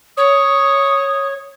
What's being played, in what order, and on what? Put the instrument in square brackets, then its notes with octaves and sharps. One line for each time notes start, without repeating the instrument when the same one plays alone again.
[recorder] C#5 [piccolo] D#6